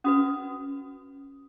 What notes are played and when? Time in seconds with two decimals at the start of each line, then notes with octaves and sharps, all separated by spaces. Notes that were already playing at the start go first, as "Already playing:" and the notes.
0.04 C#4 F#4 B4 D#6